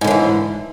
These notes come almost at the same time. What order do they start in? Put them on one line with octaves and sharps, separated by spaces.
G#2 D3 F3 E3